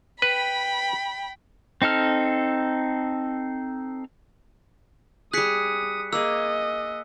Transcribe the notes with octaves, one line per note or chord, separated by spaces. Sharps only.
B4 G5 B5
C4 D#4 A4 F6
G3 G#4 D#6 F#6 B6 C#7
A#3 G#4 D#5 E6